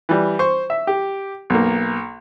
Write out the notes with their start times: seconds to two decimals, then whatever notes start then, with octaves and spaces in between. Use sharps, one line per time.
0.09 E3 G3
0.39 C5 C#6
0.70 E5
0.87 G4
1.50 B1 A#3